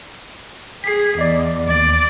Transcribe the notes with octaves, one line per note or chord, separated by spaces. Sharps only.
G#4 B6 C7
E2 D5 D#5
D#2 D5